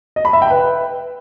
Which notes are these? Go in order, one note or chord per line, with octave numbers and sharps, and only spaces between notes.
D#5
B5
E5
G5
B4